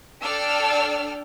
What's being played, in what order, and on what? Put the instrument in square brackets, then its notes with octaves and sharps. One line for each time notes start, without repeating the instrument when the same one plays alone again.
[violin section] D4 A4 D5 G5 E6 F6